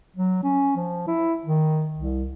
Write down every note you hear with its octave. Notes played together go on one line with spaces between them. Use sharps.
F#3
C#4
F3
E4
D#3
C2